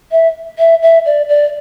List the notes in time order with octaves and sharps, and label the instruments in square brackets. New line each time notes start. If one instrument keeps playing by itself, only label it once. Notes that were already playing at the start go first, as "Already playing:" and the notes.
[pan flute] E5
E5
E5
D5
D5